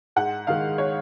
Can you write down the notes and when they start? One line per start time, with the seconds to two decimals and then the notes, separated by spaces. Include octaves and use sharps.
0.16 G#2 F#5
0.47 D#3 G#3 F5
0.78 C#5